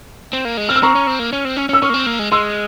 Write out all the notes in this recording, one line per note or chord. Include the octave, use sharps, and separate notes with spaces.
C4
A#3
G#3
C4 F6
E6
C4 A#5 C#6
C#4
C4
A#3
C#4
C4
C#4
C#4
E6
C#4 C#6 F6
A#3
C4
A#3
G#3
G#3 C6 E6